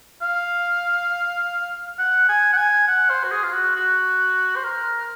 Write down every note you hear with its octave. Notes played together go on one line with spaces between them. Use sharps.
F5
F#5
G#5
F#5
G#5
F#5
C5
F#4
G#4
F4
F#4
F#4
C5
A#4